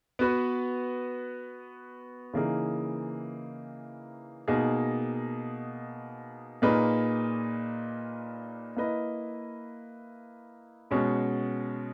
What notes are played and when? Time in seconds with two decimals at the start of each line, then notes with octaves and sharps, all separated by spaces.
0.19 B3 F#4 B4
2.33 C#3 E3 A#3 D#4 G#4
4.48 B2 A#3 D#4 G#4
6.62 A#2 A#3 D#4 G#4 B4
8.77 A#3 E4 B4 D#5
10.91 B2 G#3 C#4 F#4